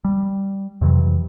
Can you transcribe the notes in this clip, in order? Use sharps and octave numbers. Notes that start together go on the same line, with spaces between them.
G3
F2 C3 E3 F#3